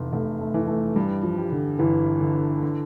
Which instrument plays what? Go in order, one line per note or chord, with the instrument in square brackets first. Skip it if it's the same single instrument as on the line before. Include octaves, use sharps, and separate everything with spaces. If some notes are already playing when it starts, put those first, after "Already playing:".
Already playing: [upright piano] F1 E2
[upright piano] F1 [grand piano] A3
[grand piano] A3
[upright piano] E3
[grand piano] A3
[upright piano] G2 [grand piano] G3
[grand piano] F3
[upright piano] G3
[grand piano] D3
[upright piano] G1 [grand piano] E3
[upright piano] D3
D3